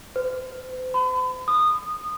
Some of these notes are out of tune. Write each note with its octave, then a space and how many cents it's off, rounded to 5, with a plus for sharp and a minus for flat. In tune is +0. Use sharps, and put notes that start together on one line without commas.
C5 -40
B5 +40
D#6 -20